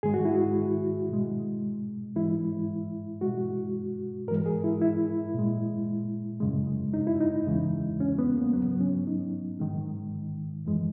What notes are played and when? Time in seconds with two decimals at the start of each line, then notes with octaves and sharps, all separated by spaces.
0.03 G#2 D#3 G#3 G#4
0.14 F#4
0.25 E4
0.35 F#4
1.09 B2 G#3
2.16 G#2 E3 G#3 E4
3.21 B2 G#3 F#4
4.28 G#2 E3 G#3 A#4
4.46 G#4
4.64 E4
4.81 E4
5.34 A#2 G#3
6.40 F#2 C#3 G#3
6.94 D#4
7.07 E4
7.21 D#4
7.47 E2 C#3 E3 G#3
8.00 C#4
8.19 B3
8.36 A#3
8.53 G#2 F#3 B3
8.81 C#4
9.07 D#4
9.60 G#2 D#3 G#3
10.65 F#2 E3 G#3